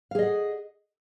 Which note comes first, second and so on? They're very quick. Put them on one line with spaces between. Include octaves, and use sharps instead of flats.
F5 G#4 D#5 F#5